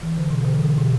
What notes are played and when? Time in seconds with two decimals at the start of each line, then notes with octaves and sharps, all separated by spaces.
0.03 E3
0.17 D3
0.30 B2
0.45 D3
0.54 E3
0.63 D3
0.77 B2